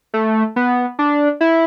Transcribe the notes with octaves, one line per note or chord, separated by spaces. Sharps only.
A3
B3
D4
E4